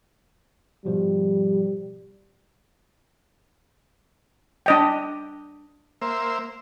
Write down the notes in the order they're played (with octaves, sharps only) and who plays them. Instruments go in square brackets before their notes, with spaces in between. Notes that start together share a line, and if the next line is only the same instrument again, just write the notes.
[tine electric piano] G#2 B2 F3 [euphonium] G3
[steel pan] D4 D#5 G5
[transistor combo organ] A#3 C5 E5